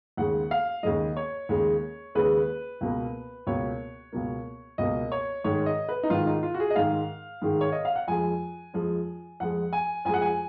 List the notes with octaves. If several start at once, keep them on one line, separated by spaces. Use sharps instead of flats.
D#2 C#3 G#3 F#5
F5
D#2 C#3 G#3 D#5
C#5
D#2 C#3 G#3
D#2 C#3 G#3 B4
C#2 B2 A#3
C#2 B2 A#3 C#5
C#2 B2 A#3
C#2 B2 A#3 D#5
C#5
G#2 D#3 G#3 C#5
D#5
B4
D#4
G#2 D#3 G#3 F4
D#4
F4
F#4
G#4
D#5
G#2 D#3 G#3 F5
G#2 D#3 G#3
C#5
D#5
F5
F#5
F2 F3 G#3 G#5
F2 F3 G#3
F2 F3 G#3 F#5
G#5
F2 F3 G#3 G#5
F#5
G#5